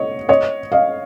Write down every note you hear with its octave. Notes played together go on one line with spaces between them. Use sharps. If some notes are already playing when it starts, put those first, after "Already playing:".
Already playing: C#5 D#5
C#5 D#5
D#5 F5